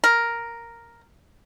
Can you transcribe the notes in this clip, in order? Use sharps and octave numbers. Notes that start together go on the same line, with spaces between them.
A#4